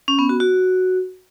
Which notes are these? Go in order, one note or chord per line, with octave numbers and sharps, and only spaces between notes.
C#4
B3
F#4
F#4